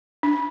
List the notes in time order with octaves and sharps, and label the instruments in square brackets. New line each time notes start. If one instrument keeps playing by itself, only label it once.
[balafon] D4